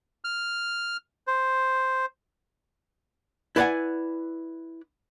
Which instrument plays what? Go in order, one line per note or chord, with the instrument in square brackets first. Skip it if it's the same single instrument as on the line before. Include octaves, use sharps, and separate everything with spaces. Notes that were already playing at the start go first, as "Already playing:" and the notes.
[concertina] F6
C5
[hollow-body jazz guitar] E4 B4 D5 F5 F#5 G#5